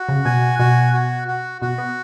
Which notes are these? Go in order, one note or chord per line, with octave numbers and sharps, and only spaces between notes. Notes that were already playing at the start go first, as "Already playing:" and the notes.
Already playing: F#4
C#3
B2 G#5
B2 F#4
F#4
F#4
B2 F#4
B3